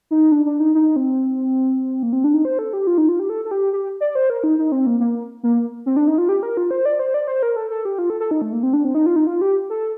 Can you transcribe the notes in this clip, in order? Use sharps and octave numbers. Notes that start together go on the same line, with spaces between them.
D#4
D4
D4
D#4
D#4
C4
A#3
C4
D4
D#4
C5
A4
G4
F4
D#4
F4
G4
A4
A4
G4
G4
D5
C5
A#4
D#4
D#4
C4
A#3
A#3
A#3
C4
D4
D#4
F4
G4
A#4
F4
C5
D5
C5
D5
C5
A#4
A4
A4
G4
F4
A4
A4
D#4
A3
A#3
C4
D4
C4
D#4
F4
D#4
F4
G4
A4